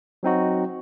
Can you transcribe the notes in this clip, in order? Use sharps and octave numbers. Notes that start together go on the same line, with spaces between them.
F#3 C4 D#4 F#4